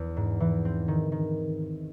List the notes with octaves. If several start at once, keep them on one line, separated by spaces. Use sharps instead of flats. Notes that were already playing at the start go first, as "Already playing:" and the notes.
Already playing: E2
G#2
E3
C4
D#3
D#3